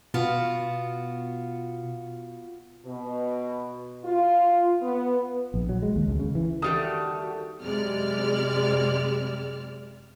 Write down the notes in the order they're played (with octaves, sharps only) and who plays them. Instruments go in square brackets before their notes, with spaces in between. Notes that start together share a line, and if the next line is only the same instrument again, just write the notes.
[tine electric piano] B2 [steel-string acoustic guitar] B3 F4 F#4
[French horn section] B2
F4
B3
[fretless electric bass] A#1
F#3
G#3
D#2
C#2
C#3
E3
[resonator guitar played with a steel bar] D#3 G3 A3 [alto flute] F#4 [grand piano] D#6
[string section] F#2 C3 G3 G#3 D5 F6